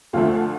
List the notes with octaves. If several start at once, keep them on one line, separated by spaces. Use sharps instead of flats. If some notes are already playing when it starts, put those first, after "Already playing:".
D2 D3 F3 A3 F4